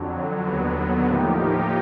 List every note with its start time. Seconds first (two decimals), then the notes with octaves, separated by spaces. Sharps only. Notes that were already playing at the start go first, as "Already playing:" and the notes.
Already playing: F2 D3 F#3
0.45 D#2 D3 F#3 B3
1.08 A2 F3 A#3 D#4 G4